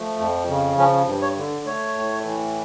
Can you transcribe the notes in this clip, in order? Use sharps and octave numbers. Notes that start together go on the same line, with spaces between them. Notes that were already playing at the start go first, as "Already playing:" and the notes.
Already playing: F3 A3
F2
C#3
F3 C#4
G2
C#5
D3
A3 C#5
A2
E3